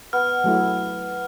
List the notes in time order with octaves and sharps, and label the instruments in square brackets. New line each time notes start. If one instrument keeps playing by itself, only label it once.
[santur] B3 [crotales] F6
[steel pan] F#3 A3 E4